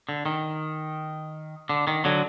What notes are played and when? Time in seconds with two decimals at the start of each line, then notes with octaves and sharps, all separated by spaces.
0.09 D3
0.26 D#3
1.69 D3
1.87 D#3
2.05 D3 F#3